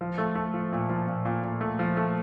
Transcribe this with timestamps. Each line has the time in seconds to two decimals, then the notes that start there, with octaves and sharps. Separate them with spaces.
0.01 F3
0.18 A3
0.35 A3
0.54 F3
0.72 A#2
0.89 F3
1.08 A#2
1.25 A#2
1.44 A#2
1.61 A3
1.79 F3
1.97 A3